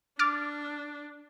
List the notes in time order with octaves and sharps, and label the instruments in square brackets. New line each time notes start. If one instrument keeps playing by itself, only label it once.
[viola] D4 [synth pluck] D6 F6 A6